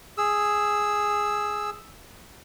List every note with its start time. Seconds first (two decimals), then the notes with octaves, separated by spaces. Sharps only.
0.18 G#4 E6